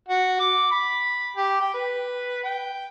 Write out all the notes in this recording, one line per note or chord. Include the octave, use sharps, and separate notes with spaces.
F#4
D6
B5
G4
G5
B4
G5